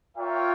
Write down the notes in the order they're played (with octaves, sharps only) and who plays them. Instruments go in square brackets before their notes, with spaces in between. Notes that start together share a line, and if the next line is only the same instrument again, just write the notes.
[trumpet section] F4 A#4 C#5 E5 G5